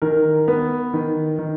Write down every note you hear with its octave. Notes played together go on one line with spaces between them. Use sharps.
D#3 A#4
B3
D#3
D#3